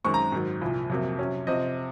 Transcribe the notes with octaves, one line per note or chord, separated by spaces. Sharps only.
F#2 D#3 G#3 C4 C#6
A#5
G#2 D#3 F#3
C2 A#2 F3
F2 C3 F#3 A#3
C3 F#3 C#4
C3 F3 C4 D#5